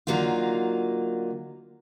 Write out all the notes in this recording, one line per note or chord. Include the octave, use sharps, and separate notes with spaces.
D3 F#3 A#3 D#4 F4